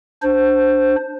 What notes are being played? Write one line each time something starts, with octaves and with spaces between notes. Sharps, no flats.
D4 C5